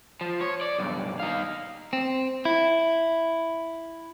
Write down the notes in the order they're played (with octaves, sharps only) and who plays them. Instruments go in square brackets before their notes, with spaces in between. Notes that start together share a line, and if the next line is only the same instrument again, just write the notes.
[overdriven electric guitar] F3
C#5
D5
B1 G2
D#4 F5
[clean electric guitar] C4
E4